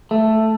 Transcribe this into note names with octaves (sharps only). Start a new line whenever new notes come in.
A3